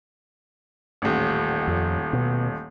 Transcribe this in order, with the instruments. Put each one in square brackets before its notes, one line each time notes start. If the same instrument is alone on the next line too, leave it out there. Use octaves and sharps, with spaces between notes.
[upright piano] D#1 A1
[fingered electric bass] F2
B2